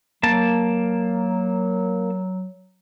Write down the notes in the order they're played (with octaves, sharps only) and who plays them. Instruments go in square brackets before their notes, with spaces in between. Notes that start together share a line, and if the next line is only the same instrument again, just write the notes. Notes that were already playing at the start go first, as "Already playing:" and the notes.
[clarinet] F#3 [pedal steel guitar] A#3 A5